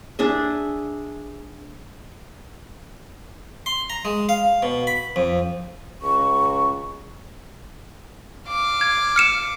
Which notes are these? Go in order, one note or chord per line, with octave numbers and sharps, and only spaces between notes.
D4 G#4 E5
C6
A#5
G#3
F5
B2
B5
F2
C#2 C#6
F5 D6
G#6
F6 C#7 E7